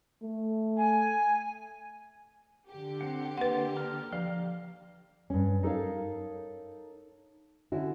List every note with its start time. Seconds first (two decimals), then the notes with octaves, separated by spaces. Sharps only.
0.22 A3
0.77 G#5
2.70 D3 G4
3.01 C4 F#5
3.38 A#3 B4 F#5 C6
3.76 A#5 F6
4.13 F3 F5 A#5
5.30 G2 C#4
5.63 D#4 A4 A#4 C#5 F5
7.72 D3 C#4 E4 F#4